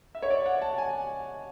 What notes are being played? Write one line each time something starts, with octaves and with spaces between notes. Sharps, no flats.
E5
C#5
D5
F#5
A5
G#5